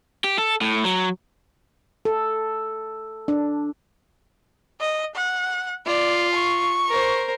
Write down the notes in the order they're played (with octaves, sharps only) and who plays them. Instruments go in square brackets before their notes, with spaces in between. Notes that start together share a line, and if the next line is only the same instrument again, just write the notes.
[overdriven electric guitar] G4
A4
A2
F#3
[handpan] A4
D4
[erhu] D#5
F#5
[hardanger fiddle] F4 [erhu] D5
[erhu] C#6
[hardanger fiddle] A#4 C5